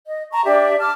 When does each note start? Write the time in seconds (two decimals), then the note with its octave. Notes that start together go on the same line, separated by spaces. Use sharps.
0.06 D#5
0.32 A5 A#5 C#6
0.44 D4 G4 D5 E5
0.78 A5 D6 F6